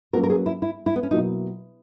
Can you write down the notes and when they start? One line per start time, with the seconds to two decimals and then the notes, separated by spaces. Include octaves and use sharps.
0.13 F#3 A#3 C#4 F#4 A#4 B4
0.23 A#4
0.30 G#4
0.46 E4
0.62 E4
0.86 E4
0.96 B3
1.03 C#4
1.11 B2 F#3 A#3 D#4 E4